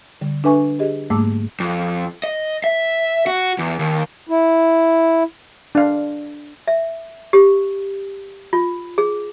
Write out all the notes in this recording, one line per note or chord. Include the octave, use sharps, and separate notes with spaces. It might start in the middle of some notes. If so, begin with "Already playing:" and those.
D3 G3
D4 A4 B4 E5 G#5 C#6
G4 G#4 D#5
G#2 G3 A3 A#3 D6 E6
F2
D#5
E5
F#4
E2
D#2
E4
D4 F5
E5
G4
F4
G#4